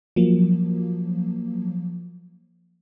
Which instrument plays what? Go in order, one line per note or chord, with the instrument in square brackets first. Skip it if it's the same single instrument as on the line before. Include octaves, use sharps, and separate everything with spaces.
[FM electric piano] F3 F#3 A#3